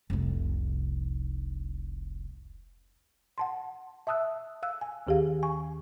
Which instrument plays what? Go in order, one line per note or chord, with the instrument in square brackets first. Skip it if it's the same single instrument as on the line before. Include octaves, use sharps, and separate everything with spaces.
[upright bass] F1 C2
[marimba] F#5 A5 C6
E5 A5 D#6 E6 F#6
F5 E6 F#6
G#5
D#2 D#3 G4 G#4 F5
G#5 C#6